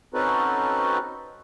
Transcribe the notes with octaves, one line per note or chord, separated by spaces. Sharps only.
C4 C#4 D#4 F#4 A4 B4